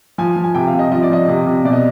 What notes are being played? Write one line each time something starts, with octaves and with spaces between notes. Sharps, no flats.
F3 G#5
F3
G#5
C3 G5
F5
C3
D#5
F3 D#5
D5
F3 D#5
C3
C3
B2 D5
D#5